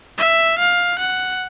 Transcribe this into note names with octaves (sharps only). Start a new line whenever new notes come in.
E5
F5
F#5